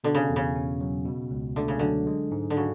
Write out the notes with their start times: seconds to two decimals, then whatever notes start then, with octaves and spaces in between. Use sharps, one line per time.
0.04 B2 D3
0.15 C#3
0.30 E2
0.36 C#3
0.56 C#4
0.81 F#3
1.05 B2
1.31 C#2
1.56 D3 A3
1.68 C#3
1.79 D3 F#3
2.07 G#3
2.32 G#2
2.50 D3
2.57 C#3 F#4